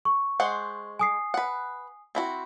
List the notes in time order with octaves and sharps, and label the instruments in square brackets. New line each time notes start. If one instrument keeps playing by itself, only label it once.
[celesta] C#6
[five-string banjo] G#3 C5 F#5
[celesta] G#5 D#6 C7
[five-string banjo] B4 F#5
C4 E4 F#4